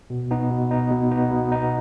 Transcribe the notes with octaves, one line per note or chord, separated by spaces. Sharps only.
B2
B3 D#4
B2
B3 D#4
B2
B3 D#4
B2
B3 D#4